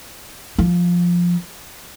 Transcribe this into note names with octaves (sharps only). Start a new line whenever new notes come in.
F3